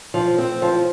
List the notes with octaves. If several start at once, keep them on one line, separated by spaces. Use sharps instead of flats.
F3
C4
F3